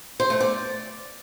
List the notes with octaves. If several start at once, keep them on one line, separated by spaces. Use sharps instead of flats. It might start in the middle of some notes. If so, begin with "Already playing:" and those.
C5
A3
D5